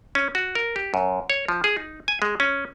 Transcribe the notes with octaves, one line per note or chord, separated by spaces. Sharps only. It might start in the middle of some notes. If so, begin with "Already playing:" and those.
C#4
F#4
A#4
G4
F#2
C#5
F3
G#4
D#4
G#5
G#3
C#4